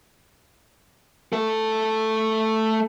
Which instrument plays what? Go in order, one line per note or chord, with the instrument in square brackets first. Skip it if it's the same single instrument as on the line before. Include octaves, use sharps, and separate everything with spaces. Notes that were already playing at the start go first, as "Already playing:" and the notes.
[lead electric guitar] A3 A4